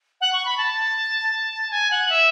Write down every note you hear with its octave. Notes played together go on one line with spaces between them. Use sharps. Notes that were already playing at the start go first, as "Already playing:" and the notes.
F#5
C#6
B5
A5
G#5
F#5
E5